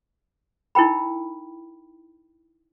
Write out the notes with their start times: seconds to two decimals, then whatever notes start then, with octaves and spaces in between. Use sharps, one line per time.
0.75 D#4 E4 A#4 G5 B5